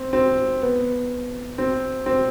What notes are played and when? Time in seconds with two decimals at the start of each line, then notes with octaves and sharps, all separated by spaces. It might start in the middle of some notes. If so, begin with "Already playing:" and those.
Already playing: C4
0.13 C4
0.62 B3
1.58 C4
2.06 C4